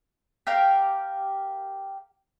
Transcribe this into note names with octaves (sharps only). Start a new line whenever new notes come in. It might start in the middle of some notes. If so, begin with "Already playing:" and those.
G4 A#4 F5 G5